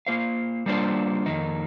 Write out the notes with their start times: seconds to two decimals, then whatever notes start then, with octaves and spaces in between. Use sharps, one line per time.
0.07 A#3 F4 C5 F5
0.66 G3 A#3 D4 F4 C5
1.26 F2 D#3 A#3 D#4